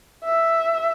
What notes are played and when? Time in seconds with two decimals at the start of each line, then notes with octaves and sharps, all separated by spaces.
0.25 E5